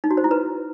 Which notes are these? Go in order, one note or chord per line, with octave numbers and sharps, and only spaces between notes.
D#4
F#4
C5
E4
B4